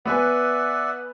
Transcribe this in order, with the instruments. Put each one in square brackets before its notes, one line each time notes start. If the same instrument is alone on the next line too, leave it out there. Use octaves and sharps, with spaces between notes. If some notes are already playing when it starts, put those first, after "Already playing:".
[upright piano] B3 B4 G#5 [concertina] D5 E5 F#5